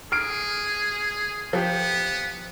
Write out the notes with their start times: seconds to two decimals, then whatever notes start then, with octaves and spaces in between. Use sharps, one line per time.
0.12 G#4 F6 C7 D7
1.53 F3 B3 G4